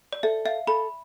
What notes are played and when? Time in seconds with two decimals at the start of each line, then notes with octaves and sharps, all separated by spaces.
0.13 D5
0.23 A4 E5
0.45 E5 F5
0.67 A4 B5